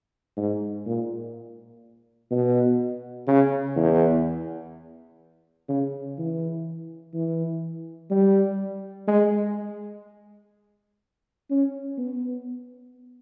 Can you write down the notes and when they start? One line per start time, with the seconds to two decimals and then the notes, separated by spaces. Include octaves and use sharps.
0.37 G#2
0.86 A#2
2.31 B2
3.27 C#3
3.76 E2
5.69 C#3
6.18 E3
7.14 E3
8.10 G3
9.07 G#3
11.50 C#4
11.98 B3